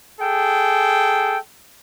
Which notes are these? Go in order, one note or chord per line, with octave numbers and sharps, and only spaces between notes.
G#4 A4 G5